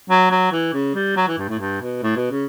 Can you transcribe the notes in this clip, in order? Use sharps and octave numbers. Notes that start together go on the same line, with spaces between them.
F#3
F#3
E3
C#3
G3
F#3
E3
G2
A2
G2
B2
A2
B2
C#3